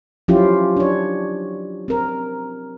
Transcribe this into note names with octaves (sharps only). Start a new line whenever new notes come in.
F3 F#3 C#4 E4 F4 G4
D4 C#5
C4 A#4